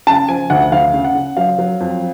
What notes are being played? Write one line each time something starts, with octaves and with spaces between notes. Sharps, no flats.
C#3 A5
F3 G#5
D2 F#5
D2 F5
C#3
F#5
C#3
F#3 F5
F#3
F2